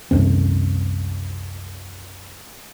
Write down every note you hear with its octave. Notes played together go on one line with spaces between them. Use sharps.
C2 F#2 C3 C4